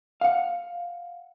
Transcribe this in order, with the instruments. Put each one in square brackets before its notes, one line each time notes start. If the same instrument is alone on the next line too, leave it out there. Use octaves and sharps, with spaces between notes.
[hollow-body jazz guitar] F5 F#5